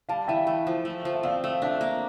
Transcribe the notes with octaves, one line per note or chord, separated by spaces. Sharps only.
G3 F5 A5
E3 E5 G5
A3
F3
A3
F3
E5
C4 D5 F5
A3
D4 E5
A#3